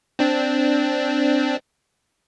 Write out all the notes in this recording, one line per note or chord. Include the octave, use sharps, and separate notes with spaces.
C4 D4